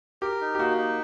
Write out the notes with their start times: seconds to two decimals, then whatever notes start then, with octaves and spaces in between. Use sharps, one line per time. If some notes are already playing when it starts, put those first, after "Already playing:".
0.22 G4 A#4
0.41 D#4
0.55 G4
0.59 A#3 F#4
0.77 D#4